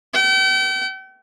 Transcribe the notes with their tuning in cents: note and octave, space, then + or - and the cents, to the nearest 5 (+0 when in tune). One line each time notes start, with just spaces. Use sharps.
G5 -40